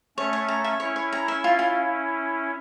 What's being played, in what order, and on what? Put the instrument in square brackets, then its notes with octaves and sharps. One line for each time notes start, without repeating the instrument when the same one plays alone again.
[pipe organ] A3 C#4 [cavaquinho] C#5
[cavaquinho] C#5
A#5
E5
[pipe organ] C#4 E4 [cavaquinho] C#5
[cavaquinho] C#5
A#5
E5
F4
F4